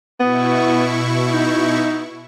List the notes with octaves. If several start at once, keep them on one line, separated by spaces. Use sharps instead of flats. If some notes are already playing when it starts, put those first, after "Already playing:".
B2 B3 E4 C#6
D#4